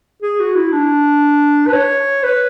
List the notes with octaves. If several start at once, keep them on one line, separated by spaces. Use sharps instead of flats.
G#4
F#4
E4
D4
B4
C#5
B4